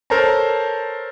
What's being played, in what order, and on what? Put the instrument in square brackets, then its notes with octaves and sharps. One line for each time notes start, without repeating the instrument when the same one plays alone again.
[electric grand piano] A4 A#4 C5 C#5 A5 A#5